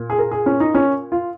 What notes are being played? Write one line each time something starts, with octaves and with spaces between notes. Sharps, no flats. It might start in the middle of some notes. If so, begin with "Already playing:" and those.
Already playing: A#2
G#4
A#4
G#4
C#4
D#4
C#4
F4